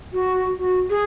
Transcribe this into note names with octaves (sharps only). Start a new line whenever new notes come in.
F#4
F#4
G#4